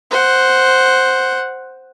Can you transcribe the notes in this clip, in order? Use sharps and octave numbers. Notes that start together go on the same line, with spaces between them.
C5 F#5